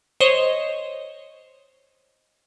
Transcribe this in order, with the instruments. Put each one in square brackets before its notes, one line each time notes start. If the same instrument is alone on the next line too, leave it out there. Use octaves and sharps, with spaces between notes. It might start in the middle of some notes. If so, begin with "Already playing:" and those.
[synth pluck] C5 C#5 D#5